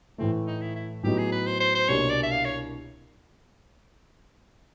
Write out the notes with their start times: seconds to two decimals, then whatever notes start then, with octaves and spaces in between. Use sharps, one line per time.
0.18 A2 E3 A3 C4
0.47 D#4
0.61 E4
0.75 E4
1.03 A2 F#3 B3 D#4 G4
1.18 G#4
1.32 B4
1.46 C5
1.60 C5
1.75 C5
1.88 C2 B2 G3 A#3 D4 C#5
2.10 D5
2.23 E5
2.31 F5
2.45 C#5